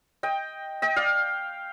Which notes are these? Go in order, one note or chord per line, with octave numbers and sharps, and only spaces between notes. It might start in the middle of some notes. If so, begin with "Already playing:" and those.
D#5 G5
D#5 G5
D5 F5